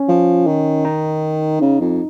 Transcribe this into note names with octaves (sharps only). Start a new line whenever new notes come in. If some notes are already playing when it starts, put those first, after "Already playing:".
Already playing: C#4
F3
D#3
D#4
C#3
F2